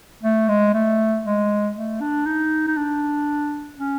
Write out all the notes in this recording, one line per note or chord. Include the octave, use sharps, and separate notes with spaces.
A3
G#3
A3
G#3
A3
D4
D#4
D#4
D4
C#4